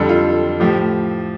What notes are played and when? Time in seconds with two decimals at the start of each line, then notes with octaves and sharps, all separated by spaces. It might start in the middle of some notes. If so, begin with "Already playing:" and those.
Already playing: F2 D3 G3 A4
0.09 F4
0.60 A2 F3 G4